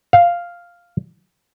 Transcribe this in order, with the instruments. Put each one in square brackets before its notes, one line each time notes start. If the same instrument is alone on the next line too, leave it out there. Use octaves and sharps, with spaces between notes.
[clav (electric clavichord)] F5